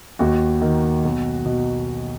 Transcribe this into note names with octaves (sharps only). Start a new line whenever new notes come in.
D#2 F#4
D#3
B1
B2